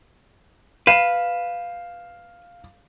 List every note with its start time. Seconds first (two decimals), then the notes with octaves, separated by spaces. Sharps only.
0.87 B4 F5 C7 E7